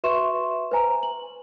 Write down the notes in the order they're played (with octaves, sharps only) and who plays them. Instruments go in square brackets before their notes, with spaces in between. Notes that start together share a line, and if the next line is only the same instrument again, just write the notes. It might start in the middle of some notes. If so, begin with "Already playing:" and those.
[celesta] F#4 B4 E5 C6 C#6 E7
B4 C5 G#5 A#5
F#7